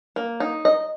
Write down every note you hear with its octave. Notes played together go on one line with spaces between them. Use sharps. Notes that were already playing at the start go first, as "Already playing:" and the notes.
A#3
D#4
D#5